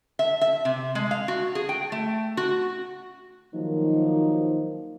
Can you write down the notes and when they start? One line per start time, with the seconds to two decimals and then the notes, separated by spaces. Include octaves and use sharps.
0.19 E5
0.41 E5
0.65 C3
0.95 G#3
1.11 F5
1.28 F#4
1.55 G#4
1.69 G5
1.92 A3
2.37 F#4
3.55 D#3 F3 F#3 A#3 D#4